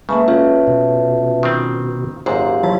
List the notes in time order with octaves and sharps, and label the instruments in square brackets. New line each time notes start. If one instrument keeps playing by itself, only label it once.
[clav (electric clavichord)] C#3 [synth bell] G#3 A#3 [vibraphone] B4 E5 A5
[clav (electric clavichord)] B1 [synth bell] C#4 F4
[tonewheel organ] B2
[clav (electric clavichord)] D#3 G3 C4
[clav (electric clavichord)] G#1 F#2 A#2 [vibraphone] G4 F5 [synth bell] C5
[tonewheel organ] F3 F#3 E4 [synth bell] A5